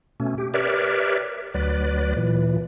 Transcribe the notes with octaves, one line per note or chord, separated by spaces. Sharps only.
B2 A3 C#4
G4
G4 A#4 B4 C#5 D5 E5
D2 F#3 B4 D5
A#2 E3